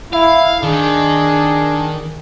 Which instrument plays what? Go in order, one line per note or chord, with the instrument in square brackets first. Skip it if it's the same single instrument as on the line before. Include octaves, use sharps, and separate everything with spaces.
[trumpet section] E4 [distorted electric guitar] F5
[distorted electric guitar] D#3 [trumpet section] D4 G#4